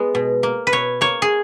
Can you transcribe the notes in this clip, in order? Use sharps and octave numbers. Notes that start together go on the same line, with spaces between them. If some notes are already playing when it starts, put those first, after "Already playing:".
Already playing: G#3 B3
B2
A#3
B4
B2 C#5
A#3 C#5
G#4